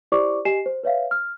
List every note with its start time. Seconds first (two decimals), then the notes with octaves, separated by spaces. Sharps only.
0.12 E4 G4 C5 D5 C#6 D6
0.45 G4 D#5 G#5 C7 E7
0.66 C5
0.83 B4 C#5 E5 F5
1.11 F6